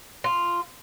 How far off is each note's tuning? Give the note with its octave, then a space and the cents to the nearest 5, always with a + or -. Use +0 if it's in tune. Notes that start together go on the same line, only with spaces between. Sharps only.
F4 -5